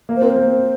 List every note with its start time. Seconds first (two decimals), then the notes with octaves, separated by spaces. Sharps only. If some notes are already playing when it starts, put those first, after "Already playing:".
0.09 A#3
0.16 C5
0.22 C4 A#4
0.30 A#3 C5
0.48 C4